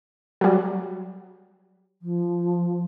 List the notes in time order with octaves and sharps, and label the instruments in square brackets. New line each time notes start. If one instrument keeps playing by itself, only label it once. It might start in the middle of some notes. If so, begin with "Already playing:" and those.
[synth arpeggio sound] F#3 G3
[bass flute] F3